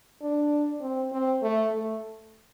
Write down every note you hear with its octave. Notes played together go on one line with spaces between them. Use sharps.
D4
C4
C4
A3
A3